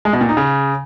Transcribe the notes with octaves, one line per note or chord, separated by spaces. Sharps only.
G#3
B2
A#2
D#4
C#3